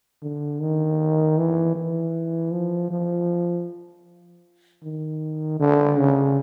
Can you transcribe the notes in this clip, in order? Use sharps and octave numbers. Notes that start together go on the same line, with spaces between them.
D3
D#3
E3
E3
F3
F3
D#3
D3
C#3